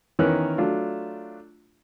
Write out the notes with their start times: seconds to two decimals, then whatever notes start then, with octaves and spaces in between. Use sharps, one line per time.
0.19 D#3 E3 B3 C#4 A#4 F#6
0.58 F#3 A3 D4 F4